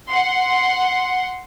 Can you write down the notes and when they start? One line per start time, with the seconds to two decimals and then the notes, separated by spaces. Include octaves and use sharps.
0.10 F#5 C6